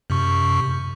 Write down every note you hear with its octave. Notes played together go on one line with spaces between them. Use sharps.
F#2 C3 C#6